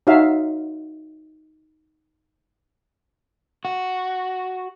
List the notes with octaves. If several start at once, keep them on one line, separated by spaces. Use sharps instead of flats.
D#4 F#4 C#5 E5 F5
F#4